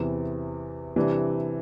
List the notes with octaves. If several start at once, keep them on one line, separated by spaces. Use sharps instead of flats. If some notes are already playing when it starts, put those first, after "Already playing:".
Already playing: E2 C3 E3
C3 E3 G3 D4